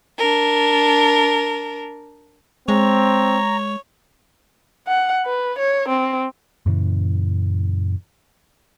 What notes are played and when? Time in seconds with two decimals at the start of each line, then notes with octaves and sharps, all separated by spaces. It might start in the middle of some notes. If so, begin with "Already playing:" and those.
0.18 D4 A#4
2.68 G#3 C4 C#5 A#5
4.88 F#5
5.26 B4
5.59 C#5
5.89 C4
6.66 F#2 A#2 C#3 E3